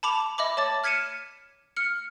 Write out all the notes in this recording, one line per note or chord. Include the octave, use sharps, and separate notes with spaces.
A5 B5 D6 F7
D#5 E5 B5 D6
C#5 A5 D6 A6
F6 G#6 B6 C#7 D#7 E7
F6 C#7